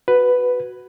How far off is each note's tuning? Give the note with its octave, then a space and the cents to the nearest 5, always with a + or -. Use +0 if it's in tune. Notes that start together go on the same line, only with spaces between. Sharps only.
F#4 +0 B4 +5